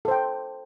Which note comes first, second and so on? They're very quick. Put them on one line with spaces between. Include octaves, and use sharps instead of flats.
A4 C5 G5